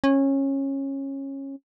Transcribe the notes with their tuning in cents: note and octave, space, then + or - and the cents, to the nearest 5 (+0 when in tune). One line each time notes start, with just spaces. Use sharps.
C#4 -20